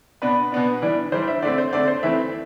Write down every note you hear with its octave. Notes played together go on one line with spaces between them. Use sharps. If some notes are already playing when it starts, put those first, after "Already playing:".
B2 B3 D4 B4
B2 B3 D4
E3 G3 D4
E3 G3 D4 C5
E5
D3 A3 C4 D5
C5
D3 A3 C4 D5
C5
E3 A3 C4 E5